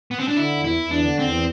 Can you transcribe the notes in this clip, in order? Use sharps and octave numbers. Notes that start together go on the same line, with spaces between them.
B3
C4
D4
D3 E4
E2
E4
E2
D4
D3
E2 C4